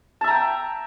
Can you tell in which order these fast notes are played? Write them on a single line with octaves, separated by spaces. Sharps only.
A5 E5 A#5 G5